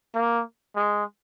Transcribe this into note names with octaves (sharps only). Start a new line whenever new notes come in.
A#3
G#3